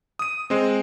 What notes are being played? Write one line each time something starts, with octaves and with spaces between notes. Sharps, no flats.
D#6 D#7
G#3 C4